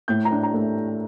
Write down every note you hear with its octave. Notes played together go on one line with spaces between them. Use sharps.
A2 G6
A#5
D4
A#5
A3